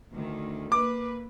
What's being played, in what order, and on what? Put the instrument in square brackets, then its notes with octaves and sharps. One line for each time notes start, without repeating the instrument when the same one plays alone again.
[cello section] D2 D#3
[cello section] A#3 B4 [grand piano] D6